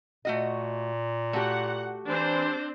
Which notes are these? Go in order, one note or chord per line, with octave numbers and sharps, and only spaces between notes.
A#2 A3 F#4 D#5
A3 F#4 G4 F#5
E3 C4 D4 C5